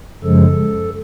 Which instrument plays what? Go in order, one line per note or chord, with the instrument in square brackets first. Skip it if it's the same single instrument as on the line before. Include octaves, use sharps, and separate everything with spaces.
[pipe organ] F#2 C#3 F3 G#3 A4